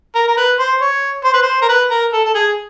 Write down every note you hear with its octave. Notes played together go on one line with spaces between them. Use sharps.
A#4
A#4
B4
C5
C#5
C5
B4
C5
A#4
B4
A#4
A4
A4
G#4